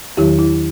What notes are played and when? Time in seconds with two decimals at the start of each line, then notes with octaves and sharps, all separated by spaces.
0.17 E2 D#3 F#3 E4 G4
0.39 E4